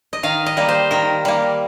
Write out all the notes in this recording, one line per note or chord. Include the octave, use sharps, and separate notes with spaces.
D#5
D#3 F5
D#5
G3 A#3
C5
D#3 A#4
G3 A#3